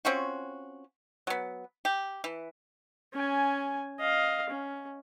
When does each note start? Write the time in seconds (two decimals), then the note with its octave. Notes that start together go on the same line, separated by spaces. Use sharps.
0.05 C4 C#4 F4 F#4
1.27 F#3 B3
1.85 G4
2.24 E3
3.14 C#4 G#5
4.00 D#5 F5
4.50 C#4